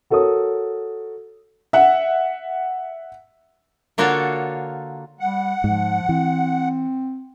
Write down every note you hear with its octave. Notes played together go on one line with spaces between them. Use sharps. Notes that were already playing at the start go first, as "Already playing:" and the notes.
F#4 A4 A#4 C#5 D#6
E5 F#5
D3 A#3 F4 F#4 A4 C#5
G3 F#5
G#2 F3
E3 C4